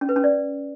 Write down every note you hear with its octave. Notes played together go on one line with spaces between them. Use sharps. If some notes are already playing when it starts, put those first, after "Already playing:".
C#4
B4
C#4
D5